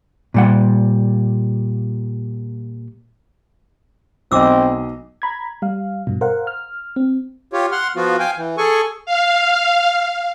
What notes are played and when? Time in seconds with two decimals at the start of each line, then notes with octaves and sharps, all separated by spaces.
0.34 A#2 G3 F#5
4.32 B1 C4 D#5 D6 E6
5.22 A#5 B5 G#6
5.62 G3 F5
6.07 G2 B2
6.21 A#4 C5 F5 F#5
6.47 F6
6.96 C4
7.53 F4 G4 C#5
7.72 F#5 C6 F6
7.96 F3 B3 F4 F#4
8.19 F5 G5 G#5
8.37 E3
8.58 G#4 A4 G#5 C#6
9.06 F5